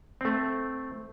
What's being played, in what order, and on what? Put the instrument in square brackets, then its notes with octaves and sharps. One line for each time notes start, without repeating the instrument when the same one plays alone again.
[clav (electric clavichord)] A3 C4